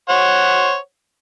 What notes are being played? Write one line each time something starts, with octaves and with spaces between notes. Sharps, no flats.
C5 C#5 F#5